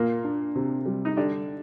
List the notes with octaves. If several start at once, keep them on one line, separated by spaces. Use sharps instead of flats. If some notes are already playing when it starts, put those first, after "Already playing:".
Already playing: A#2 A#3 F4
D4
C3
G3
D#4
D3 D4 G4